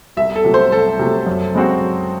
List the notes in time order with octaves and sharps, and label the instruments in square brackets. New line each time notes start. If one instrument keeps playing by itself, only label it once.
[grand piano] C2 [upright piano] E5
[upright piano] A4
[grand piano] C3 F#3 A3
[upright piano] C5
[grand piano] C2 [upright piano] A4
[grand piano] C3 F#3 A3
F#2
C#3 G#3 C4 F#4
F#2